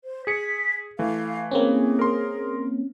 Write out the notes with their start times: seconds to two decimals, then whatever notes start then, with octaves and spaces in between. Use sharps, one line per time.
0.04 C5
0.27 G#4 B6 C#7
0.99 E3 A3 F5
1.51 A#3 C4 C#4 G#4
1.99 A#4 C6